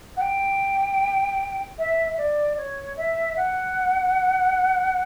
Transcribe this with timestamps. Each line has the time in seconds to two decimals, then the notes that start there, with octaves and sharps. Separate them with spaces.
0.17 F#5
0.21 G5
1.78 E5
2.18 D5
2.57 C#5
2.97 E5
3.36 F#5